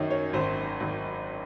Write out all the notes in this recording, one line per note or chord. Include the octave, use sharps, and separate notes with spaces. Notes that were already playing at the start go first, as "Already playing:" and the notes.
Already playing: F#2 D#3 C#5
C#5
G#1 C5
G#1